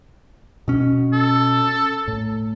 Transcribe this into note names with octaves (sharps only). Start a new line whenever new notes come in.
B2 C#4
A4
A2